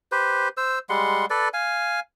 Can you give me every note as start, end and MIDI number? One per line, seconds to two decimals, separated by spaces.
0.12 0.49 67
0.12 0.49 71
0.12 0.49 72
0.57 0.79 72
0.57 0.79 88
0.89 1.26 55
0.89 1.26 56
0.89 1.26 78
0.89 1.26 84
1.30 1.49 69
1.30 1.49 71
1.30 1.49 74
1.54 2.00 77
1.54 2.00 80